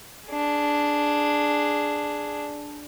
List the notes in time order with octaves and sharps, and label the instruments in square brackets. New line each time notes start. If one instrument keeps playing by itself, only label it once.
[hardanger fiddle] D4 G#4